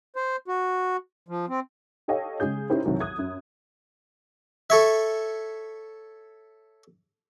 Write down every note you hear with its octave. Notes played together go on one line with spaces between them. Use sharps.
C5
F#4
F3
C4
G4 A4 C#5 D#5 F5 G5
C#3 G#3 G#4 G6
C#4 D#4 E4 G4 A#4 C5
C2 D#3 E3 F#3 F#4
D#6 F#6 G#6
F#2
A4 C#5 E5